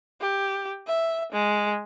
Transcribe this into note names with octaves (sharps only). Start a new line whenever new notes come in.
G4
E5
G#3